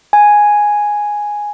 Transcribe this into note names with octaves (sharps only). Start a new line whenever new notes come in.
G#5